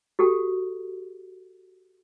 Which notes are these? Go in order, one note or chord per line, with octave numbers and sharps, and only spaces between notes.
F#4 G4 A4